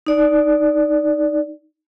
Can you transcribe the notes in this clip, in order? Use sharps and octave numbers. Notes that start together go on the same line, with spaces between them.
D#4 D5